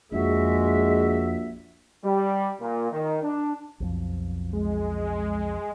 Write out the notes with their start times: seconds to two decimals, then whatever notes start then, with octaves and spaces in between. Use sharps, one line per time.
0.12 A#1 F2 G#3 F#4 E5
2.04 G3
2.60 A#2
2.91 D#3
3.22 D4
3.80 B1 F2 F3
4.53 G#3